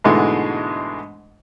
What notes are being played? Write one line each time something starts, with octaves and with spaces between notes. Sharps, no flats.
G#2 B2 D3 E3 G#3 A3